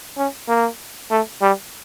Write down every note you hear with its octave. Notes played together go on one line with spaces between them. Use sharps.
C#4
A#3
A3
G3